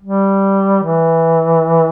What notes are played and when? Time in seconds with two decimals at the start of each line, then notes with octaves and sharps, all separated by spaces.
0.03 G3
0.83 E3